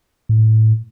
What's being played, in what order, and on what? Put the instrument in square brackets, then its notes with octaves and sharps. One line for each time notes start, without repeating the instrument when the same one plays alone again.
[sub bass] A2